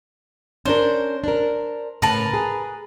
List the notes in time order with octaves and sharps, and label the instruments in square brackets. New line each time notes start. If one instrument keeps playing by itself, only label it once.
[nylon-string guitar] C#4 D4 A#4 [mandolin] C5
[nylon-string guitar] D4 A#4
[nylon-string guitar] A2 C#3 [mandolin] A#4 B4 A5
[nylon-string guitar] G#4